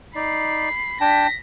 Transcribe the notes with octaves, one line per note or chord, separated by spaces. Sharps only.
D#4 D5 B5 C7
D4 G5 A5 A#6 B6